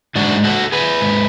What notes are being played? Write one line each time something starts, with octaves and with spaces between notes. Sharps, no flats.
G#2 D4 F#4
F#4 A4
G#4 B4
G#2